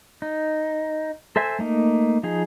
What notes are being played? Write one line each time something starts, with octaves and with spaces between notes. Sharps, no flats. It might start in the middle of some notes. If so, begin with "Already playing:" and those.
D#4
A4 C5 E5 G#5
A3 A#3 D#4
F3 D#4 G#4